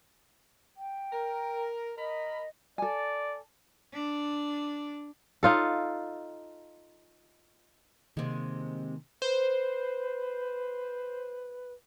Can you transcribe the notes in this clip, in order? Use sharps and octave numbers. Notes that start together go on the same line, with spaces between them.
G5
A#4
A#4 D#5 B5
A4 D5 G#5
D4
D#4 F4 A4
C3 D#3 G#3 A#3
B4 C5